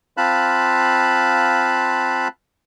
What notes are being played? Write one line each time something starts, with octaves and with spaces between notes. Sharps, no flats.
C4 F4 F5 A5 B5 F#6